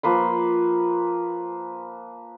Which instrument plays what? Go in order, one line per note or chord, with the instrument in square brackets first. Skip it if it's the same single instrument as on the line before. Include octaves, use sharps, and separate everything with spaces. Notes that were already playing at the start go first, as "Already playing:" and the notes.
[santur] F3 A#3 B4 C6